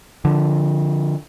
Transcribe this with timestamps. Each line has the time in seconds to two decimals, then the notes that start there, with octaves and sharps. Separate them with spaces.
0.25 D3 F3